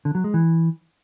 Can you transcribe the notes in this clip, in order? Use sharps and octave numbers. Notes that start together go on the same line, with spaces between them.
D3
F#3
G#3
E3